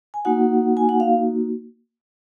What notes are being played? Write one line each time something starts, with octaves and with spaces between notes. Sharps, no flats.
G#5
A#3 D#4 F#4 F#5
G#5
F#5
F5